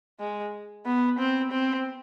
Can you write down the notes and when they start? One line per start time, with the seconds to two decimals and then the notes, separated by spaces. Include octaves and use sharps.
0.19 G#3
0.86 B3
1.18 C4
1.51 C4